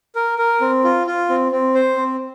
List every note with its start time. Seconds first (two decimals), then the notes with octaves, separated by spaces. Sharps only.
0.16 A#4
0.39 A#4
0.61 C4
0.84 F4
1.07 F4
1.29 C4
1.52 C4
1.75 C5
1.97 C4